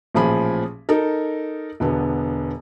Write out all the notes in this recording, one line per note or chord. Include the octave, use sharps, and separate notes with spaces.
A1 A#2 F3 G#4 B5
D#4 A4 A#4
E1 D3 B3